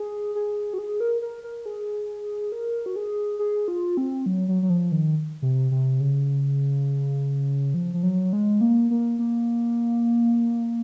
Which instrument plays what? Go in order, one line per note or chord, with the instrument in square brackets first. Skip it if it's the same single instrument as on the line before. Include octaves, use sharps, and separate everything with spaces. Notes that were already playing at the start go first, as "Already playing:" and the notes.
Already playing: [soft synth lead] G#4
G#4
F#4
G#4
A#4
A#4
A#4
G#4
A#4
F#4
G#4
G#4
F4
C4
F#3
F#3
F#3
F3
D#3
C3
C3
C#3
F3
F3
F#3
G#3
A#3
A#3
A#3